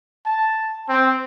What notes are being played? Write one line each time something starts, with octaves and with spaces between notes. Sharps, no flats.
A5
C4